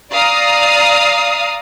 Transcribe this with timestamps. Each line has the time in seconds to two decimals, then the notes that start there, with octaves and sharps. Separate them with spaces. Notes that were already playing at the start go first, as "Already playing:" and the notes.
0.13 D5 F5 A#5 D#6